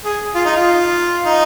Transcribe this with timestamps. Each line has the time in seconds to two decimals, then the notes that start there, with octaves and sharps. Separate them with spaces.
0.05 G#4
0.35 F4
0.45 D#4
0.56 F4
1.26 D#4